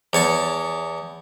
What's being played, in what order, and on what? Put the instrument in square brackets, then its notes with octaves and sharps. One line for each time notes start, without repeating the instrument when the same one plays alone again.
[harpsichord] E2 C#5 A5 C#6